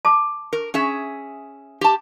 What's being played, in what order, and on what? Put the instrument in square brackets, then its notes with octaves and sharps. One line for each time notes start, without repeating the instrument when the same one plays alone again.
[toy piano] A5 D6
[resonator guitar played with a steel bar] A#4
C#4 G#4 E5
G4 A5